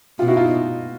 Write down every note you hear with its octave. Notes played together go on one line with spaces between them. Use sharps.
B2 F4 G4
E4 F#4
D#4 F4